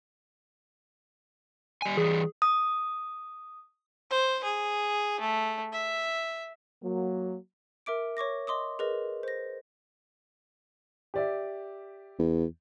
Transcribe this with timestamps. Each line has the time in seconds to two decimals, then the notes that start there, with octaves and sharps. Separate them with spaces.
1.82 G3 G#5
1.97 E3 G3 G#4
2.42 D#6
4.10 C5
4.44 G#4
5.20 A3
5.72 E5
6.81 F#3 A#3
7.86 A#4 E5 D6 D7
8.17 C#5 C#6 D6 A#6
8.47 D#5 C6 D6 D#6
8.79 G#4 A#4 B4 D#5
9.23 C5 A#6
11.14 G4 D5 E5
12.19 E2